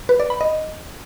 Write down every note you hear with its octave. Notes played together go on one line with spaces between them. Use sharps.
B4
D5
B5
D#5